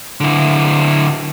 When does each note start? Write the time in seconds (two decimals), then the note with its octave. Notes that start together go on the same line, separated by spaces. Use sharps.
0.20 D3 E4